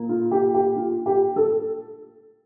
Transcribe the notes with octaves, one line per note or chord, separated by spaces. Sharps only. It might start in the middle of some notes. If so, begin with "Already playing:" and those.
Already playing: A#2
F4
G4
G4
F4
G4
A4